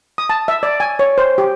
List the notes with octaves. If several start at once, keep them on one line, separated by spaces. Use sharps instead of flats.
D#6
A5
E5
D5
G#5
C#5
C5
G4